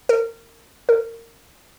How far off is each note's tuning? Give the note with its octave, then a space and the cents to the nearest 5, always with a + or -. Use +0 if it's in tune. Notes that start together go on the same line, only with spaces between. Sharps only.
A#4 -25
A#4 -20